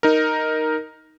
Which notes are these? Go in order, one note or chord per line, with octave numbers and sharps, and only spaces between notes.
D#4 A#4